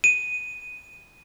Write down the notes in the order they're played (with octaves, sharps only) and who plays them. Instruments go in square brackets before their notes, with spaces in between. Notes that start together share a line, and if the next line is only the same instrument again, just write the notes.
[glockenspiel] D#7